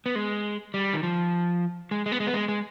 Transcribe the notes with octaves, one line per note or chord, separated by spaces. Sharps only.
B3
G#3
G3
D#3
F3
G#3
G#3
B3
G#3
B3
G#3
G#3